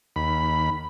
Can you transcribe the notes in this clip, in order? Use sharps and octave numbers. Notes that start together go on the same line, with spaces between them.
D#2 B5